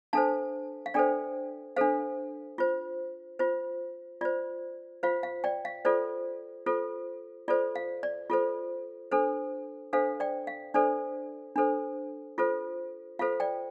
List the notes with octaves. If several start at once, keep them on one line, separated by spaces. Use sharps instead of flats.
D4 A4 C5 F5 A5
F5
D4 A4 C5 D5 G5
D4 A4 C5 F5
F4 C5
F4 C5
F4 C5 D5
F4 C5 F5
F5
D5 G5
F5
F4 A4 C5 D5
F4 A4 C5
F4 A4 C5 D5
F5
D5
F4 A4 C5
D4 A4 C5
D4 A4 C5 F5
D5 G5
F5
D4 A4 C5 D5
D4 A4 C5
F4 A4 C5
F4 A4 C5 F5
D5 G5